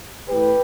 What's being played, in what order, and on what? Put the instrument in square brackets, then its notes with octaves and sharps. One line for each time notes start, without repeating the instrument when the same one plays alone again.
[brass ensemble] A2 E3 A3 G4 B4